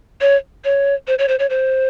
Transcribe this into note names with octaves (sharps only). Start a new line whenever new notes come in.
C#5
C#5
C5
C#5
C5
C#5
C5